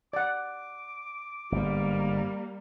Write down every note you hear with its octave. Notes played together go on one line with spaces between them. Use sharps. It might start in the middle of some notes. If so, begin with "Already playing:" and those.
D5 F#5 D6
G1 G#2 G3 A#3